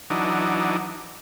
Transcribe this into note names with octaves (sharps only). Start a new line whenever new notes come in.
E3 F#3 D4 D#4